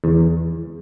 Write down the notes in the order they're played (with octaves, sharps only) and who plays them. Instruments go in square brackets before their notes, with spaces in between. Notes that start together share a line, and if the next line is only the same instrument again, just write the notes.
[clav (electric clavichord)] E2